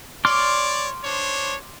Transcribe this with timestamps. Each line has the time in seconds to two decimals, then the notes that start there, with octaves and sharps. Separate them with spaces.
0.25 C#5 D5 C6 D6 F6
1.04 D4 C5 C#5